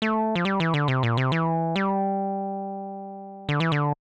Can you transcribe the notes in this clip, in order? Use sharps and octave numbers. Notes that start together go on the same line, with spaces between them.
A3
F3
G3
E3
D3
C3
A#2
C3
E3
G3
D3
E3
D3